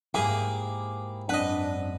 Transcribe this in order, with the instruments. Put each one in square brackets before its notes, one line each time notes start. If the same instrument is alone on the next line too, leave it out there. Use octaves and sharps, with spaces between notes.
[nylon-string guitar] G#2 E5 F5 [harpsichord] A#3 G#4 [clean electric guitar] E4 G4
[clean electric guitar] F#2 C4 F#5 [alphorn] D4 [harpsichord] B4 D#5